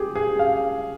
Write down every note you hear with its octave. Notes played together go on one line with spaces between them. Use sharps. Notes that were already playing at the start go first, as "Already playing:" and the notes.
Already playing: G4 G#4
G#4
F5